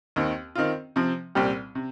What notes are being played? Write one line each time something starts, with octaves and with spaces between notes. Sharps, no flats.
D#2 D#3 C4
D#3 C4 F4
C3 F3 C4
C2 A#2 G3 C4 G4
C3